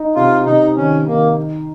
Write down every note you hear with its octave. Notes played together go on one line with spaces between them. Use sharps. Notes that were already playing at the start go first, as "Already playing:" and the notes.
Already playing: D#4
C3 F4
C3 D#4
D#3 C#4
D#3 A#3
D#4